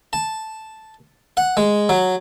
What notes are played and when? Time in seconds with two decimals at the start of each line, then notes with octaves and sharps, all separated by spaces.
0.13 A5
1.37 F#5
1.57 G#3
1.89 F#3